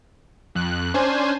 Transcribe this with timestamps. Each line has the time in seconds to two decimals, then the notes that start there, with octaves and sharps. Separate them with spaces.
0.55 F2 F#6
0.94 C#4 D4 C5 G#5